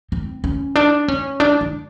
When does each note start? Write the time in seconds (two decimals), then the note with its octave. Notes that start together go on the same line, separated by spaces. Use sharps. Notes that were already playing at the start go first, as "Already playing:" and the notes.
0.12 C4
0.44 C#4
0.75 D4
1.08 C#4
1.40 D4
1.61 D4